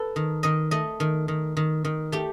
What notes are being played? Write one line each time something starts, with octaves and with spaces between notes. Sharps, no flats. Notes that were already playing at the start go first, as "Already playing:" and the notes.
Already playing: A4 B4
D#3
D#3 D#5
A3 D#5
D#3
D#3
D#3
D#3
A3 G4